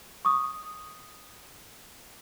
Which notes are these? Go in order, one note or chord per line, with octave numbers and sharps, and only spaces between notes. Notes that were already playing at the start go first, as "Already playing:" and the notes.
C#6 D#6